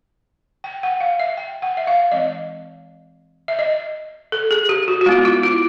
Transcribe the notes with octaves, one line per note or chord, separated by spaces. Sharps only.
G5
F#5
F5
E5
G5
F#5
E5
F5
E3 G#3 C4 D#5
E5
D#5
A4
G#4
G4
F#4
F#4
G#3 B3 E4 F4
F4
E4